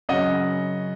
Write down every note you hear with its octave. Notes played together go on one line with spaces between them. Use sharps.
F#2 C#3 D#5 F#5